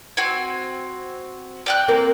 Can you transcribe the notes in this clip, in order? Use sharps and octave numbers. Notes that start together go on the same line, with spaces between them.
C4 F#4 G#5
D5 G5 F#6
A#3 C4 A#4